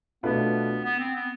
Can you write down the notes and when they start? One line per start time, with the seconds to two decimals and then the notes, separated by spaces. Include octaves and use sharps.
0.23 B2 A3 B3 D4 F4 B4
0.84 B3
0.99 C4
1.15 B3